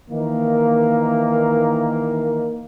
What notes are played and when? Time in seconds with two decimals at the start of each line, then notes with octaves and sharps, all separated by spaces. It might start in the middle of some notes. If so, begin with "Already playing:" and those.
0.11 D#3 E3 A#3